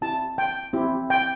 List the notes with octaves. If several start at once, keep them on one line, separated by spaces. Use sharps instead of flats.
C4 E4 G4 A5
G5
C4 E4 G4
G5